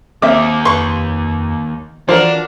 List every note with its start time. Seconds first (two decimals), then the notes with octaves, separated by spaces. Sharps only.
0.22 D#2 A#3 C4 E5 D6
0.65 F2 B4 C6 C#6
2.09 E3 F3 D4 F4 F#4 A#4